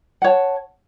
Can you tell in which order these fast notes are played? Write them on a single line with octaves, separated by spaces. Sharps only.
F#5 C#5 A5